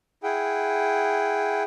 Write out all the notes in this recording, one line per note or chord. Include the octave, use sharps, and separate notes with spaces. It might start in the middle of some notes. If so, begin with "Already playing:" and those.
E4 G#4 F#5 G5